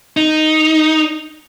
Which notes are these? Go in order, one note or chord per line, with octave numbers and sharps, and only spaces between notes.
D#4